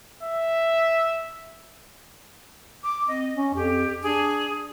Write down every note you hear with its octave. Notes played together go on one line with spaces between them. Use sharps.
E5
D6
C4 D#5
C#4
F2 G4
D4 G#4